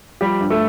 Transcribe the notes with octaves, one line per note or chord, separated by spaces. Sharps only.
F3 G3 G4
G2
A3 A4